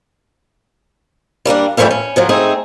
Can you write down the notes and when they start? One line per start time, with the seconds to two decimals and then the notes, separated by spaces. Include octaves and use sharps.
1.45 G3 A#3 C#4 D4
1.77 F2 E3 F3 G3 A3 G5
1.91 C#4
2.16 A2 F3 F#3
2.29 A3 C4 D#4 G#4